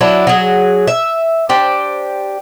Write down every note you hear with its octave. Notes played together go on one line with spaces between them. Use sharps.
F#3 D4 E4
F#3 G#4
E5
D4 G4 C5